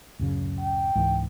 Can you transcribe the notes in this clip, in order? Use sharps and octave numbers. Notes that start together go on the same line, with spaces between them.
D1 F#2 C#3
G5
C#2 G#2 E3